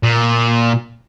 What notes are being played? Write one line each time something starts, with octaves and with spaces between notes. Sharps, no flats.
A#2